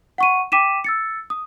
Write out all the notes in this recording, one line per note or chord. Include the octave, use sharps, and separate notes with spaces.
F#5 C#6 D#7
G5 D6 B6 D#7 E7
E6 A6 C#7
D#6